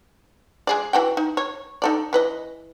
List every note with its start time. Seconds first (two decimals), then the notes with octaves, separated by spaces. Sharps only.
0.67 G#3 G#4 D5
0.93 E3 F#4 G5
1.17 D#4
1.37 C#5
1.82 D#4 A4 D5
2.13 E3 B4 D#5